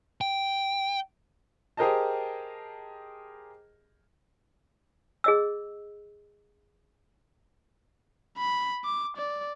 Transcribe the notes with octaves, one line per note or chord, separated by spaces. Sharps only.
G5
G4 G#4 A#4 C5 D#5 A5
G#4 D#5 E6
B5
D6
D5